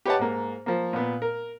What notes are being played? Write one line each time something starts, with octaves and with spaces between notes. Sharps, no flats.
G4 B4 C#5 D#5 F#5 A5
G#2 A#3
F3 A#3
A#2 B3
A#4